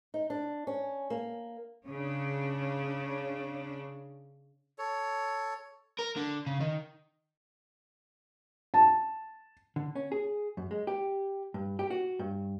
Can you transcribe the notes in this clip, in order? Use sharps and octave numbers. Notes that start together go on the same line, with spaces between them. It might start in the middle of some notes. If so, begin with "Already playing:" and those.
D#4
D4
C#4
A#3
C#3 C#4 D4
A4 C#5
A#4
D3
C#3
D#3
A5
D3
C#4
G#4
F#2
G#3
G4
G2
G4
F#4
G2